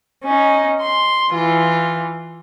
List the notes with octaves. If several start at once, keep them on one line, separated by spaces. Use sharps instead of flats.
C#4 D#4
C6
E3 F4